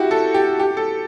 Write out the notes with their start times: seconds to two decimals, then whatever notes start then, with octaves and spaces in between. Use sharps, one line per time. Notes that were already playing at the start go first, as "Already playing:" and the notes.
Already playing: E4 F#4 G4
0.11 A4
0.34 G4
0.60 G4
0.77 A4